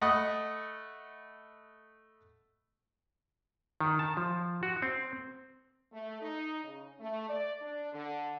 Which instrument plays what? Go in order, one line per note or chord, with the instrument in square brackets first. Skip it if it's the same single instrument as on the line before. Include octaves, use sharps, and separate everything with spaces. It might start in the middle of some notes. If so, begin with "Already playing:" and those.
[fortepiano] A3 D#5 F#5 B5 D#6
[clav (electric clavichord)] D#3
A5
F3
F#4
C4
[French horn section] A3
D#4
C#3
A3
D5
D4
D3